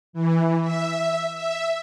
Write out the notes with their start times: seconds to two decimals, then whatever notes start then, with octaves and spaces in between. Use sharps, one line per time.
0.13 E3
0.62 E5
1.35 E5